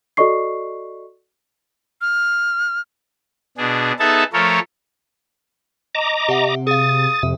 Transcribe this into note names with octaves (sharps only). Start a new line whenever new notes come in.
F#4 A4 D5 D#5 C#6 C7
F6
B2 D4 G#4
B3 D#4 G#4 A4 E5 A5
F3 A3 A4 A#4 C#5
D#5 A#5 D6 E7
C3 G4 E5 F#5
G#4 F5 D#6 A6
F2 C3 E5